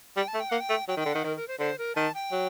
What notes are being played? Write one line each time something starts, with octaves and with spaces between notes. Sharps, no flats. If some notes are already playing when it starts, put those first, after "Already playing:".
G3 G5
A5
A3
G5
A#3 F#5
G5
A3
F#3 G5
D#3
G5
D3
D#3 F#5
D#3 A#4
A#4
C5
D3 C5
A#4
D#3 A5
G5
F#3